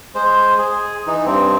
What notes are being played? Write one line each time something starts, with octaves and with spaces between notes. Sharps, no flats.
G#3 C5
G#4
E3 D#4
G2 C4